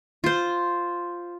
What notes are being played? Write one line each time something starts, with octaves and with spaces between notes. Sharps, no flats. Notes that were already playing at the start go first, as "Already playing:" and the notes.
F4 C5